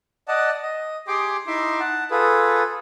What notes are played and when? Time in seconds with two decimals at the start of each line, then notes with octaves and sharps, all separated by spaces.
0.28 D5 D#5 F#5 A5
0.62 D#5
1.08 G4 G#4 G5 C6 D6
1.47 D#4 E4 E5 C6 D6
1.80 F#5 A5
2.11 F4 G#4 A4 B4